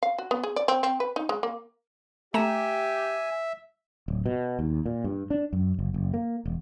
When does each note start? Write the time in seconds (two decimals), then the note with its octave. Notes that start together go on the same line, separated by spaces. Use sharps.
0.03 F5
0.18 F#4
0.31 B3
0.43 G#4
0.56 D5
0.68 C4
0.83 C4
1.00 B4
1.16 D#4
1.29 G#3
1.43 A#3
2.34 A3 G4 E5 G#5 A#5 E7
4.08 D1
4.26 B2
4.59 D#2
4.86 A#2
5.04 G2
5.30 D4
5.53 F#2
5.79 F#1
5.94 F#1
6.14 A#3
6.46 E1